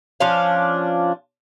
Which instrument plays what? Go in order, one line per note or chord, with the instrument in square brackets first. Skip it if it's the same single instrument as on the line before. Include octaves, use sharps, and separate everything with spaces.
[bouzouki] F3 C#4 D4 F5